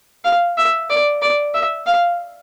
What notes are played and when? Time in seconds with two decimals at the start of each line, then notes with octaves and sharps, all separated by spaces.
0.24 F5
0.57 E5
0.90 D5
1.22 D5
1.54 E5
1.86 F5